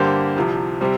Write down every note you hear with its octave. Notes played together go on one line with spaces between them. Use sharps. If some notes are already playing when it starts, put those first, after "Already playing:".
Already playing: G2 D3 A#3 G4 C5
C2 C3 F3
C3 G3 C4